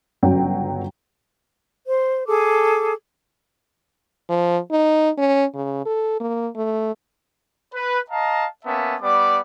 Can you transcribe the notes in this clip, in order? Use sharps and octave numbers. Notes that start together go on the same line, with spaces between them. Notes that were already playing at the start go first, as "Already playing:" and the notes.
G1 C#3 F#3 G5
C5
G#4 A4 D6
F3
D#4
C#4
C#3
A4
A#3
A3
B4
D#5 F5 A5 A#5
A#3 B3 C#4 E5 A5
G3 B3 D5 D6